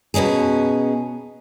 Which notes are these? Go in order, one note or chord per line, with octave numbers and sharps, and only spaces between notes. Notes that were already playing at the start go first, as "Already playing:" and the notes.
B2 B3 C#4 D#4 G#4